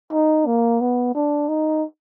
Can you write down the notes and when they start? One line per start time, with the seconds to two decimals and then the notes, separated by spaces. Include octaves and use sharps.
0.12 D#4
0.46 A#3
0.81 B3
1.15 D4
1.48 D#4